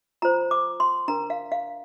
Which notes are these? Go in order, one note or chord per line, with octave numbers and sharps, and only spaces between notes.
F4 C5 A#5
D6
C6
D4 A#4 A#5
F5
F5